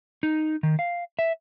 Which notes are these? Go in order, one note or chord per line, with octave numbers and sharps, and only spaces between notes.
D#4
D#3
F5
E5